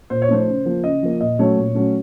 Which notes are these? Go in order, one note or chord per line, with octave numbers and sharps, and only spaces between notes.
A#2 C5
C#5
F3 A3 D#4 C5
C#3
F3 A#3
C#3 D#5
F3 A#3
A#2 D#5
F#3 A3 C#4 C#5
A#2
F#3 A3 C#4